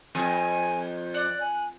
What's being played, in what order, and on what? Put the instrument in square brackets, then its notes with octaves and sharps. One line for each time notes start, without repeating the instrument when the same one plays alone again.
[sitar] F2 [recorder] G#5
[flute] D5 [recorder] F#6
[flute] G#5